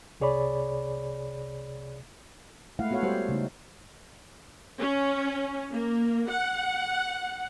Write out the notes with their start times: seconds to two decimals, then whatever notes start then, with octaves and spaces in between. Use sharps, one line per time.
0.20 C2 C3 G#4 C#5 D5 B5
2.79 G#3 A3 E4 F5 F#5
2.91 B3 F#4 A4 C#5 F5 F#5
3.03 G3 F#4 G4 C5 C#5
3.29 C#3 A3 D#4
4.81 C#4
5.72 A#3
6.30 F#5